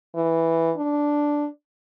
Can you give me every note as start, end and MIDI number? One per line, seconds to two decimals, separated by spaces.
0.15 0.72 52
0.77 1.48 62